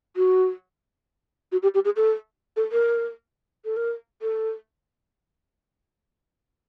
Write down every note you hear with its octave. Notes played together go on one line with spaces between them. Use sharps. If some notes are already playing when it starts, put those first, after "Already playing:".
F#4
F#4
G4
G4
G#4
A4
A4
A#4
A4
A#4
A4